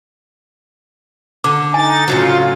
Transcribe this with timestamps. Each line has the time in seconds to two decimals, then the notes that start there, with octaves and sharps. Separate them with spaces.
1.44 D3 D6
1.74 D#4 G#5 A6
2.08 A2 C#3 F#3 F4